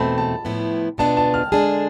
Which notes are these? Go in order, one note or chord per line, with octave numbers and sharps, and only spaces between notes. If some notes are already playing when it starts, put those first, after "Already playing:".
Already playing: E2 B2 A3 C4 A5 B5
A5
A2 F3 B3 E4
B2 B3 D4 F4 A5
A5
F6
D3 G#3 D4 G#4 A5